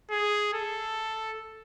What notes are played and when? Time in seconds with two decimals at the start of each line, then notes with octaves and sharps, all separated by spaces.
0.11 G#4
0.54 A4